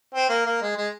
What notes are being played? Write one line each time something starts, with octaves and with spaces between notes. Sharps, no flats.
C4
A#3
A#3
G#3
G#3